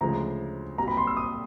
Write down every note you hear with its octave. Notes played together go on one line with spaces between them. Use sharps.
D2 C#3 F3 G#3 A#5
C2 A#2 F#3 A#5
B5
C6
E6
D#6